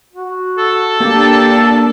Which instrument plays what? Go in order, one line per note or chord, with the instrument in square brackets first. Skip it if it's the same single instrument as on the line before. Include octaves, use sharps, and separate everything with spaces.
[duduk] F#4
[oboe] A4
[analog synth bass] A#3 [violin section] D4 A5 [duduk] G4